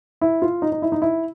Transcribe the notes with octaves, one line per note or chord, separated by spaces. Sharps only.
E4
F4
D#4
D#4
E4
D#4
E4